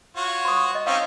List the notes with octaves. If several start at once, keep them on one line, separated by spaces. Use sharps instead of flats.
F4 F#4 C#5
C6 C#6 D#6
D#5
C4 C#4 D#4 F5